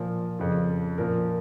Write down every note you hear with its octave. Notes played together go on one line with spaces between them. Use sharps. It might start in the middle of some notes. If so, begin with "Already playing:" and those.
Already playing: A#2 F3 A#4
F2 C#3 F3
A#2 F3 A#4